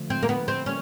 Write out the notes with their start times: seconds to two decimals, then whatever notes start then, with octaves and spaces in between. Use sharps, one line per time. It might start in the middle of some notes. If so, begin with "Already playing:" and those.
Already playing: D3 F3 A3
0.10 C4
0.23 A#3
0.29 B3
0.48 C4
0.66 G3 A#3 C#4